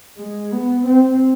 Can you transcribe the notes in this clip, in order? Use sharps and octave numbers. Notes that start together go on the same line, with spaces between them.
G#3
B3
C4